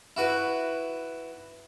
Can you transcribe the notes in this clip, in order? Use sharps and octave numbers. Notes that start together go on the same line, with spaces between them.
E4 F#4 B4